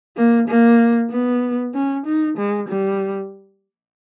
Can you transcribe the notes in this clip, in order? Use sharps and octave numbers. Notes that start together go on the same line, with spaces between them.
A#3
A#3
B3
C#4
D#4
G#3
G3